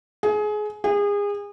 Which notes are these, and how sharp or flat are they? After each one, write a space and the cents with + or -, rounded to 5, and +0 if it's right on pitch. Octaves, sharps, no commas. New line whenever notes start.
G#4 +25
G#4 -30